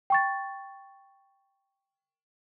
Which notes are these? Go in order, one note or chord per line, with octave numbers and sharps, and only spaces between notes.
G5 C#6 A6